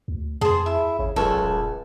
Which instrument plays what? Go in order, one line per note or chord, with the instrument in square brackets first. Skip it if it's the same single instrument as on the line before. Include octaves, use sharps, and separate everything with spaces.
[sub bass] D2
[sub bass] F2 [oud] G#4 [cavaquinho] C5 A5
[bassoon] E4 [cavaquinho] E5
[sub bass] G#1 [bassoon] C#3
[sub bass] E1 [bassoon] C#2 [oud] F#2 [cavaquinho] A4 C#5 D5
[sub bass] D#1